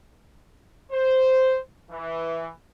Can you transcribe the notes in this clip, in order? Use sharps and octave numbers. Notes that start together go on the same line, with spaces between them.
C5
E3